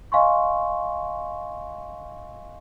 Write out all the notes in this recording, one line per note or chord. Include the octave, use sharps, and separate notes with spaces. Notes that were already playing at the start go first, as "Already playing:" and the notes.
D#5 F5 G#5 C6 C#6